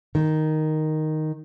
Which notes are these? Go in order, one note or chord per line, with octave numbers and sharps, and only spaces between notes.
D#3